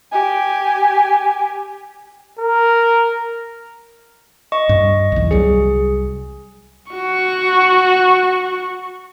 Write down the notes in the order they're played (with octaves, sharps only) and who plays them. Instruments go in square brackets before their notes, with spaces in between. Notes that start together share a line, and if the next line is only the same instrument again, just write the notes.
[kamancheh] G4 G#5
[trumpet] A#4
[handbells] D#5 C#6
[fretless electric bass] G2
B1 E2
[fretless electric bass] C2 F#3 G3 [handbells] G#4
[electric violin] F#4 C#6